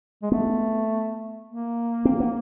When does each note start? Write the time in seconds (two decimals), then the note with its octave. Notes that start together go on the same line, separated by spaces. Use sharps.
0.23 G#3
0.31 A3 B3
1.48 A#3
2.05 C4
2.20 B3